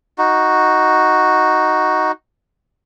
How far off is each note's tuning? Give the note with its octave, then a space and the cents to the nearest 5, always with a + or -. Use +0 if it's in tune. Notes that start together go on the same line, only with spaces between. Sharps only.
D#4 +5 F#4 +0